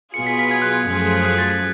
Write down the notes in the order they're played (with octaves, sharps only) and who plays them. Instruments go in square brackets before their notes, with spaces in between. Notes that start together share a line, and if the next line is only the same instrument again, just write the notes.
[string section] B2 F#3 B3 F4 G#4 [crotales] C#7
[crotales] B6
B6
G#6
F#6
G#6
[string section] F#2 F3 A3 F4 G#4
[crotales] F#6
A6
B6